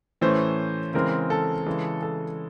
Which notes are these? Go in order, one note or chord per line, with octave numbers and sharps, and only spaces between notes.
A2 E3 A3 C#4 C5
C#3 E3 G#3 C4 A#4
A4
C#3 E3 G#3
A4